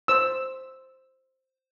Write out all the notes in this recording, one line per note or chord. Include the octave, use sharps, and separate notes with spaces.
C5 E6